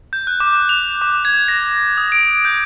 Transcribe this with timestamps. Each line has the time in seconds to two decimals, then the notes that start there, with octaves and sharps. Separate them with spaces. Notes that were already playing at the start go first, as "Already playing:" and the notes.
0.13 G6
0.27 F#6
0.40 D6
0.69 F7
1.02 D6
1.25 G#6
1.48 A#6
1.97 D#6
2.12 D7
2.45 G6